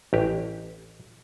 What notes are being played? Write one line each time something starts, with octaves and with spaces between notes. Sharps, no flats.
A1 G4